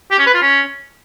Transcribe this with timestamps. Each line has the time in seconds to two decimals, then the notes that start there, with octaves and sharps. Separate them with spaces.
0.11 G4
0.19 C#4
0.27 B4
0.34 F4
0.42 C#4